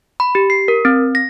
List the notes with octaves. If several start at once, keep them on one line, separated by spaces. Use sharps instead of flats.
B5
G4
C7
A#4
C4
A#6